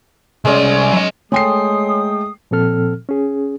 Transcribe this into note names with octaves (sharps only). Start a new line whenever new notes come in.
C2 G#3 C#4 D5
F#3 D#5
G#3 A3 C#5 G5 G#5 C6 D#6 C7
A#2 F3 C4 A4 F6
C#4 G#4